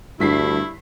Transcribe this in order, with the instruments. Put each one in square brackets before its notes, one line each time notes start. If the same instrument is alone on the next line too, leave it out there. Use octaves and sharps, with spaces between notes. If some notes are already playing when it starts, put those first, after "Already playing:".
[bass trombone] D2 [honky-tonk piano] G2 B6 C7 [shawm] E4